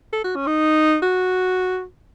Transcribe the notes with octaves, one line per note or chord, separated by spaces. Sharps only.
A4
F#4
C#4
D#4
F#4